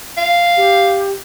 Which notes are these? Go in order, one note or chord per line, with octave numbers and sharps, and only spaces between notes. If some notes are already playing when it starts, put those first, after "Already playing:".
F5
G4